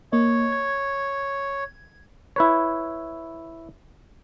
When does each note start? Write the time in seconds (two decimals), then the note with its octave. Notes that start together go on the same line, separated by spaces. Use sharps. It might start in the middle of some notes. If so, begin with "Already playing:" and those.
0.12 A#3 C#5 D#5
0.52 G#6
2.36 E4 B4 C#5